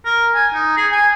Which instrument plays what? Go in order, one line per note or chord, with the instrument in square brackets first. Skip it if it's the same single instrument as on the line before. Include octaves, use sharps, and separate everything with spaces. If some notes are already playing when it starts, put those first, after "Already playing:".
[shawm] A#4
G#5
D#4
G#4
G#5